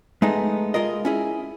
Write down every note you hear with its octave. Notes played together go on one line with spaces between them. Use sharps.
G#3 A3 B3 D#4
G#3 F4 A#4 D#5
C#4 E4 G#4